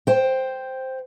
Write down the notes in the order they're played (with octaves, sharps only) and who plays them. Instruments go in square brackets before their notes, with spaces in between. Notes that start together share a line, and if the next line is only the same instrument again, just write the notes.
[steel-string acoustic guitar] C5 G5